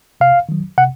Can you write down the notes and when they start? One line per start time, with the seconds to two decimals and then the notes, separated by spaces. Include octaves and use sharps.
0.20 C3 F5
0.49 D#3 F#3
0.78 C3 F#5